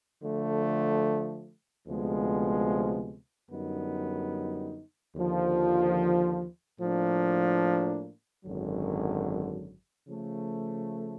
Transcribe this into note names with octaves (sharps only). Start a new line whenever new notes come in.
D3 F3 A3
D2 C3 F3 G#3 B3
F#2 D3 G3 B3 D#4
D#2 D3 F3
A2 F3 A#3 D4
G#1 F#2 D3 F#3
C#3 F3 A3